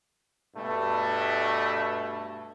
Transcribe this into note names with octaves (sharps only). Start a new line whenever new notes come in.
G2 B2 A3